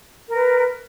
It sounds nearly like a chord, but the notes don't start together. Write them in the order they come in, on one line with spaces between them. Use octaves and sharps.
A#4 A#5 B4